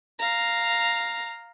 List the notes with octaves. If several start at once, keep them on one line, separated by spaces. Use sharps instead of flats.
F5 A#5